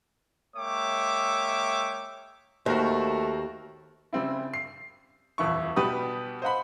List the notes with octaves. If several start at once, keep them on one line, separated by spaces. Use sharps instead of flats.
G#3 A#3 C#5 E5 G5 D6
D#2 A3 F#4 A#4 C5
C#3 G3 C4 E4
C7
D#1 F2 E3 E4 C#6
B2 G3 G4 B4 D#6
C5 D#5 F#5 B5